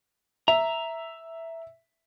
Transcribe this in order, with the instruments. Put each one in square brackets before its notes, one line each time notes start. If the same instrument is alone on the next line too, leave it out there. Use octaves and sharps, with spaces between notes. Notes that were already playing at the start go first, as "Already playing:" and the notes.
[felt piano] E5 [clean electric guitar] A#5